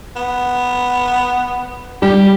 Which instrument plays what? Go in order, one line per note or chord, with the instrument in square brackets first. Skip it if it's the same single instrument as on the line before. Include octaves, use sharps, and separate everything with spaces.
[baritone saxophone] B3
[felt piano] G3 [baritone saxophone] G4